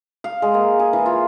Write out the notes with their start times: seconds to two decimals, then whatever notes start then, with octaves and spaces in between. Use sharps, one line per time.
0.24 F5
0.42 G#3
0.54 A#3
0.79 G#4
0.93 E3
1.06 F4